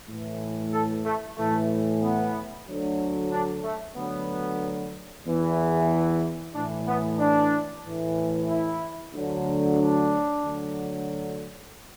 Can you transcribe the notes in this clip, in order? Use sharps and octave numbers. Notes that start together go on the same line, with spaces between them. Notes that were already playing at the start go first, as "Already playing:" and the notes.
A2 E3
A4
A3
A2 E3 A3
B3
D2 D3 F#3
D4
A3
D2 D3 F#3 B3
E2 E3
A2 E3 D4
B3
D4
A2 E3
E4
D2 D3 F#3
D4
D2 D3 F#3